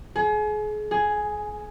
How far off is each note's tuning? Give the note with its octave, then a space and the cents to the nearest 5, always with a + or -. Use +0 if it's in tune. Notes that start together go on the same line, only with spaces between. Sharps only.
G#4 +35
G#4 +5